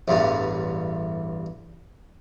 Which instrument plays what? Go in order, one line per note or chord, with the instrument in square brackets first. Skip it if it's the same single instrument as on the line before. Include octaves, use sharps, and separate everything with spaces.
[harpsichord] A1 E2 G2